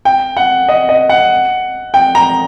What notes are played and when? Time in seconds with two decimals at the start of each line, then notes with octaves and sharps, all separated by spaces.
0.05 G5
0.37 F#5
0.68 D#5
0.89 D#5
1.09 F#5
1.94 G5
2.15 A#5